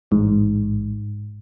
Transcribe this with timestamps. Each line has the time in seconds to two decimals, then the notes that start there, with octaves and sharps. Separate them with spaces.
0.11 A1 G#2